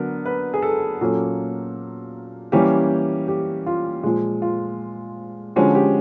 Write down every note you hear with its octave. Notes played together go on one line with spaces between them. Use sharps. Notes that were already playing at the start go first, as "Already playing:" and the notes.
Already playing: D3 F#3 B3 D4 A#4
B4
G#4
A4
A#2 F#3 A#3 C#4 A4
E3 G3 A#3 C#4 G4
G4
F4
A#2 F3 G#3
F4
D3 F3 G#3 C#4 F#4
G4